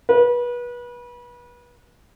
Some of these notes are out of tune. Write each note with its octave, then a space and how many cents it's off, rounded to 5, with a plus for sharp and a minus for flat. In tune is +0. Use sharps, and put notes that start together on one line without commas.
B4 -30